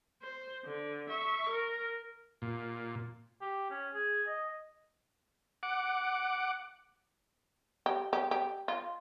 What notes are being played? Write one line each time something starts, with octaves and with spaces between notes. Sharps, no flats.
C5
D3
E5 C#6
A#4
A#2
G4
C#4
G#4
D#5
F#5 D6
G4
G4
G4
F4